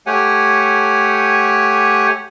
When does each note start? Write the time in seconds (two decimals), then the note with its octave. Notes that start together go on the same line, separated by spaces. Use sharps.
0.06 A3 G4 C#5 F#5 G#5